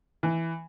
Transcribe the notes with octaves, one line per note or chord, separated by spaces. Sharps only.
E3